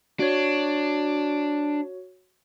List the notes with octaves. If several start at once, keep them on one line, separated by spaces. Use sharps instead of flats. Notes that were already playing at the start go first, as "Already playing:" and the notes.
D4 F#4 C#5